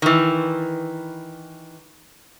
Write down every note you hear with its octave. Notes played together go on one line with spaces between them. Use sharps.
D#3 E3